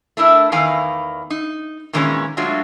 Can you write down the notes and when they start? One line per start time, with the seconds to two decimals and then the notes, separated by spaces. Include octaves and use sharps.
0.17 A3 D4 E4 A#4
0.52 E2 D#3 E3 F5 G#5
1.30 D#4
1.93 A#2 D#3 E3 G#3 B3 C#4
2.37 F#3 G#3 A3 D4 F4 F#4